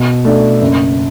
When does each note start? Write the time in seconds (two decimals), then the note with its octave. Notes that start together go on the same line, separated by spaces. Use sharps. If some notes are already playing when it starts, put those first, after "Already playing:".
Already playing: B2
0.25 A3 D4
0.61 F#1